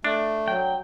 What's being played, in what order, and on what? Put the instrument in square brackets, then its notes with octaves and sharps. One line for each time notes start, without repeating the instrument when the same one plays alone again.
[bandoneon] A3 [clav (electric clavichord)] D4
[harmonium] F#3 [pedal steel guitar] G5